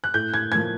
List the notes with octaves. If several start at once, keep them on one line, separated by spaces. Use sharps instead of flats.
F#6
A2 G6
G#6
F3 A#3 G#6